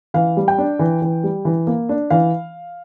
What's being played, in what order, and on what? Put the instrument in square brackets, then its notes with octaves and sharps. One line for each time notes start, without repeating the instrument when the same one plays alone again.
[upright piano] E3 F5
G3
G5
D4
E3
E3
G3
E3
A#3
D4
E3 F5